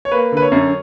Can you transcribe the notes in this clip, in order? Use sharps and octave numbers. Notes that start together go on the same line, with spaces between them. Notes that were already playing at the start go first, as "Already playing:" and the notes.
C#5
A#3 B4
D3 B4
C#5
F#2